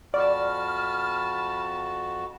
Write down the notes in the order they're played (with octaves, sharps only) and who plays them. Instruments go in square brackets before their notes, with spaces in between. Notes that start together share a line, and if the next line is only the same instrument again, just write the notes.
[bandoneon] F2 F#4 [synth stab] D5 [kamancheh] A5 B5 [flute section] F6